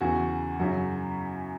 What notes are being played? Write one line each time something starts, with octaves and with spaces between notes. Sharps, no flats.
E2 C#3 E3 F#4
F#2 C#3 F#3 F#4